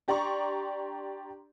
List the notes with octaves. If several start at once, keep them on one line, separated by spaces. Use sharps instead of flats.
D4 G4 D5 A#5 C6 C#6